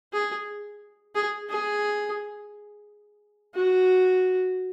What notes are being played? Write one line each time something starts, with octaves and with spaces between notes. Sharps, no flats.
G#4
G#4
G#4
F#4